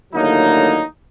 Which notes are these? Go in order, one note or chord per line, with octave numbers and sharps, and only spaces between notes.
D#2 A2 D3 F#3 A#3 D#4